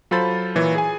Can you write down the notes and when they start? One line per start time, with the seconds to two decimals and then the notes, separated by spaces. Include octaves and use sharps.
0.11 F#3 F4 A4 C5 B5 A6
0.55 A#2 E3 C#5
0.75 G#4 G#5